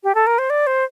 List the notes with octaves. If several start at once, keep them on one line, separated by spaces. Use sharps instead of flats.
G4
A4
A#4
C5
D5
C5